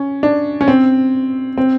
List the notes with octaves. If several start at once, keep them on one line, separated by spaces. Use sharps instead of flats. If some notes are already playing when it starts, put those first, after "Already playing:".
Already playing: C#4
D4
C#4
C4
C4